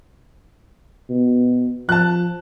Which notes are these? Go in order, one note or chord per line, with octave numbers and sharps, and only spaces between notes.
B2
F3 A5 F#6